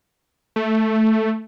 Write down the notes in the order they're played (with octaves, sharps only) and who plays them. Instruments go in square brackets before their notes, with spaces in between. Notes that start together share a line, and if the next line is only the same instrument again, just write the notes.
[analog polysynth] A3